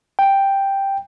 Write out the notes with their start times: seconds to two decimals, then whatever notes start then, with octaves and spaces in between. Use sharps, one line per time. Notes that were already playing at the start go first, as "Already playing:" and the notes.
0.19 G5